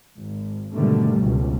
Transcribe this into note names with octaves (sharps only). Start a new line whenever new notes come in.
G#1
G#2 B2 D3 D#3 G3 A3
G1 C#2 B2